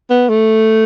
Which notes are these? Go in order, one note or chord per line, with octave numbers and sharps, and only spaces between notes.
B3
A3